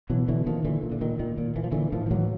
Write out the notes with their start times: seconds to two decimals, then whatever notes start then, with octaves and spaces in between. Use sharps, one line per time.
0.10 B2 E3 F#3
0.28 B2 D3 E3
0.46 A#2 D#3 F3
0.65 A#2 D3 E3
0.83 A#2
0.92 D3
1.01 A#2 D#3
1.19 A#2 D#3
1.38 A#2
1.56 A#2 E3
1.64 F3
1.72 A#2 D3 E3
1.92 A2 D#3 F3
2.06 F3
2.11 A2 E3 F#3